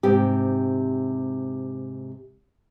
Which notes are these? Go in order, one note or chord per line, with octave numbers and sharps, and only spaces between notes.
G#2 C3 G4